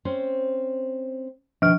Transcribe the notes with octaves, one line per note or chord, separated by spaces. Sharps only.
C4 C#4 C5
B2 D#3 F3 F6